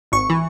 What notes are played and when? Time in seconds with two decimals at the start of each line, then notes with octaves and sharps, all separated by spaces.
0.12 G#1 C#6
0.30 E3